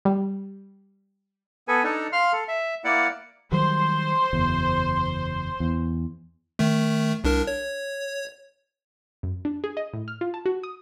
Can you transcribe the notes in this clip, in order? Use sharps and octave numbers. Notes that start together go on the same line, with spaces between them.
G3
B3 A4 B4 G#5
D4 D#4 A4
F5 C6 F6
A4
E5
A#3 E4 D5 F#5
D#3 F#3 G3 C5 C6
F#1 E2
E2
D#3 A3
C2 D4 A#4
C#5
F#2
D4
G#4
D#5
A2
F6
F4
A5
F#4
D#6